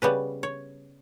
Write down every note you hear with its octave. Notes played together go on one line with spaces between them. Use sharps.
C#3 G3 B3 B4
C#5